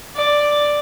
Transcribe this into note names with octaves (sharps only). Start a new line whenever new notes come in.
D5